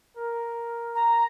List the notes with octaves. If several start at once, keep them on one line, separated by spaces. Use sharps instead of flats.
A#4
A#5